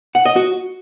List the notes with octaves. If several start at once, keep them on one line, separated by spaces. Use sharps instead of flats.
F#5
D#5
F#4